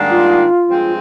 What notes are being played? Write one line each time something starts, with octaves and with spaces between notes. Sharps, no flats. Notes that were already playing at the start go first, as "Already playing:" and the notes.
Already playing: G#2 D#3 G3 A#3 D4
F4
G2 F3 G#3 C4